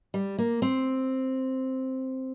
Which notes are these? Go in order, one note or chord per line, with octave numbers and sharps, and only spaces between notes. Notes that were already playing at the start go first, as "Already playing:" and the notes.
G3
A#3
C4